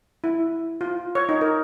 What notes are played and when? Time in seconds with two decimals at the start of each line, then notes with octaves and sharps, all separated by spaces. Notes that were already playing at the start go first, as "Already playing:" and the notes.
0.24 E4
0.81 F4
1.15 C#5
1.29 D#4
1.41 A#4